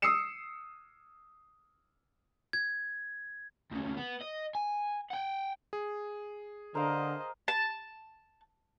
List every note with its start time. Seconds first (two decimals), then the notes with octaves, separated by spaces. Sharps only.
0.02 D#6 E6 C7 C#7 E7
2.53 G#6
3.72 D2 C#3
3.98 B3
4.22 D#5
4.55 G#5
5.10 F#5 G5
5.73 G#4
6.75 D3 A#4 C5 D#5 F5
7.48 A5